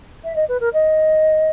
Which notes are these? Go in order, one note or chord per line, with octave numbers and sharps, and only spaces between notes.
E5
D#5
B4
A#4
D#5